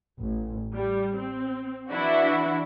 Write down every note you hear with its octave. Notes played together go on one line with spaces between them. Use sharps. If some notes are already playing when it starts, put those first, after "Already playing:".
A1
G3
C4
E3 D4 E4 F#4